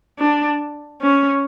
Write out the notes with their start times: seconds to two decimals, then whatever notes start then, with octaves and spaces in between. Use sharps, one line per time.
0.19 D4
1.02 C#4